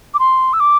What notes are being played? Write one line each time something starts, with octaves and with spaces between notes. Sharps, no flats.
D6
C6
E6
D6